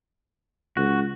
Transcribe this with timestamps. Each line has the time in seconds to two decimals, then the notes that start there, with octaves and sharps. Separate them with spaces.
0.77 C#2 F#4